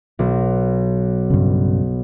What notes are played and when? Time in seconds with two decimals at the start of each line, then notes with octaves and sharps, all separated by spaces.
0.19 B1
1.30 G2 C#3